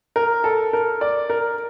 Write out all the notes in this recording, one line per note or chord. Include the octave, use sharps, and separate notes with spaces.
A#4
A4
A#4
D5
A#4